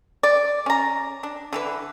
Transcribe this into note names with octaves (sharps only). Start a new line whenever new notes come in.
D5
C#4 A#5
D4
D3 E3 B4